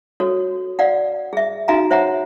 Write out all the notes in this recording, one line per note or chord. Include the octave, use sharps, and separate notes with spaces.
F#4 A4 C#5
D5 F5 F#5
G#4 E5
D#4 F#4 E5 F5 G#5 A#5
C5 C#5 E5 F#5 A#5